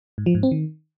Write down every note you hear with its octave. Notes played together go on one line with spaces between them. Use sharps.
G#2
F3
G#2
C4
D#3